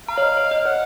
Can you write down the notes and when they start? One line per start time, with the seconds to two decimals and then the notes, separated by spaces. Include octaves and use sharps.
0.09 F5 A#5
0.18 C#5
0.22 D#5
0.37 C#5
0.51 D#5
0.65 C#5 F#5